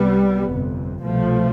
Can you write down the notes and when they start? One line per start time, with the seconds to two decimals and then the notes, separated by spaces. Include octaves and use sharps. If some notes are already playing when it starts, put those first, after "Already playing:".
Already playing: C2 C3 G3 B3
0.48 G1 F2 C3
1.04 C2 B2 F3 A3